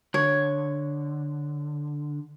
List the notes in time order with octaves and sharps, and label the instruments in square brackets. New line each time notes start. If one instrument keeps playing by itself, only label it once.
[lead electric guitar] D3 [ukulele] C#5